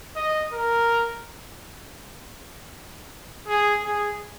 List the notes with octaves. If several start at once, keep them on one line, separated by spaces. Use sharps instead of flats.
D#5
A#4
G#4
G#4